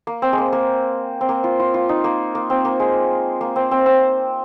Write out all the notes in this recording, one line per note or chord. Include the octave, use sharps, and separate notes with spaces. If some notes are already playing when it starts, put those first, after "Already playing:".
A#3
C4
G#3
A#3
A#3
C4
A#3
F4
F4
F4
D#4
A#3
A#3
C4
A#3
G#3
A#3
C4
C4
C4